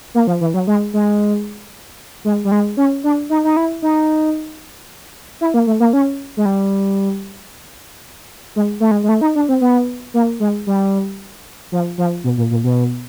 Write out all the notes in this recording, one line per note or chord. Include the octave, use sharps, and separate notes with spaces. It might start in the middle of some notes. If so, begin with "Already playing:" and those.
A#3
F3
E3
F#3
G#3
G#3
G#3
G3
G#3
C#4
D4
D#4
D#4
E4
D#4
E4
A#3
A3
A#3
C#4
G#3
G3
G#3
A3
G#3
G#3
A3
D#4
D4
C4
B3
A#3
G#3
G3
F3
F3
B2
A#2
A#2
B2